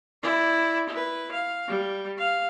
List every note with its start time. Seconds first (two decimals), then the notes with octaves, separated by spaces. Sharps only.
0.23 E4 D5
0.90 E4 B4
1.32 F5
1.68 G3
2.18 F5